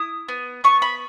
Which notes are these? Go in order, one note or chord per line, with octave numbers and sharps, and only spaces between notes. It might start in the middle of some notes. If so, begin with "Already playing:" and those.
Already playing: E4 D#6
B3
B3 C#6
B5